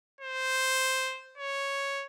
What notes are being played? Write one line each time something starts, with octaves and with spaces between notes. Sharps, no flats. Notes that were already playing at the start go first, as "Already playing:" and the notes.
C5
C#5